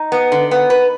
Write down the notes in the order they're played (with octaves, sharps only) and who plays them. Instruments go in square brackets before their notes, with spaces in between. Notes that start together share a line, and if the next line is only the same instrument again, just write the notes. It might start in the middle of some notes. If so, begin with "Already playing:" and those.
Already playing: [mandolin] D#4
[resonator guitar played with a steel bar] B3
D3
B3
B4